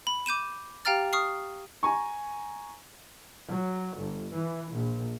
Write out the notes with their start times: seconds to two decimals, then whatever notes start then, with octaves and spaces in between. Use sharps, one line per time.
0.07 B5
0.26 D6 G6 D#7 E7
0.85 G4 F5 G5 A#5 F6 A6
1.13 C#6 D#6 F6 C7
1.83 G#5 A#5 C#6
3.49 F#3
3.98 G1
4.34 E3
4.73 A#1